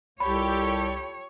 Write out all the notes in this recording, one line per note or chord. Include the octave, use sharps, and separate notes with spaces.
C2 F4 G4 A4 C#5 B5